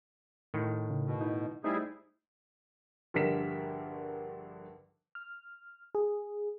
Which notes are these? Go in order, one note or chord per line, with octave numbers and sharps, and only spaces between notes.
A2 D#3
C#3
B2
D#4 E4
G3 A3 D#4 E4 G#4 C5
A#1 G2 D3 A#4 B6 E7
F6
G#4